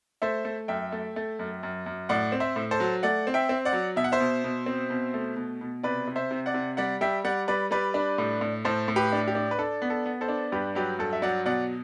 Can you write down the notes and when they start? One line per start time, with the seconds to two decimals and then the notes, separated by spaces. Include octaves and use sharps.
0.22 A3 C5 E5
0.45 A3
0.68 F#2 E5 G5
0.92 A3
1.16 A3
1.39 F#2
1.63 F#2
1.86 F#2
2.09 A2 D5 F#5
2.32 C4
2.40 C5 E5
2.56 A2
2.71 A4 C5
2.80 F#3
3.03 A3 D5 F#5
3.27 C4
3.34 E5 G5
3.49 C4
3.65 D5 F#5
3.73 F#3
3.96 B2 E5
4.04 F#5
4.12 C5 E5
4.20 B2
4.44 B2
4.66 C4
4.90 B2
5.14 A3
5.37 B2
5.61 B2
5.83 C3 B4 D5
6.07 C3
6.16 C5 E5
6.31 C3
6.46 D5 F#5
6.54 C3
6.77 G3 D5 F#5
7.01 G3 E5 G5
7.25 G3 D5 F#5
7.48 G3 B4 D5
7.71 G3 B4 D5
7.94 D4
8.18 A2
8.41 A2
8.65 A2 A4 C5
8.88 A2
8.96 G4 B4
9.12 D4
9.28 G4
9.35 D4
9.51 B4
9.58 D4 A4
9.82 B3
9.90 A4
10.06 B3
10.21 A4 C5
10.28 D4
10.52 G2 G4 B4
10.75 F#3 G4 B4
10.99 G2 A4
11.13 E5
11.22 F#3 D5 F#5
11.45 B2 D5 F#5